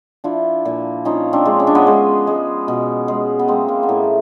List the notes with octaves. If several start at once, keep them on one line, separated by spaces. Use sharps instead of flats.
F3 D4 E4
A#2
F3 C#4 D#4
C4 D4
G#3
C#4
D4
B3 C#4
G#3
G#3
B2
G#3
B3
G#3 A#3 C4
A#3
B3
A2 A#3
A3